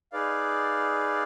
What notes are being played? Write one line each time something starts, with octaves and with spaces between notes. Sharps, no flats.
D#4 G#4 B4 D5 F5